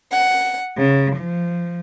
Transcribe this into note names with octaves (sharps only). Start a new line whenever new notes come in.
F#5
C#3
F3